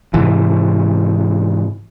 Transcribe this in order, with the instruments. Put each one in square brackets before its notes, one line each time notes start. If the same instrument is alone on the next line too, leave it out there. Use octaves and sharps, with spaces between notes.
[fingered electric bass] G#2 C3 E3